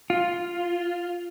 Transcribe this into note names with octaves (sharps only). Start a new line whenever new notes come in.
F4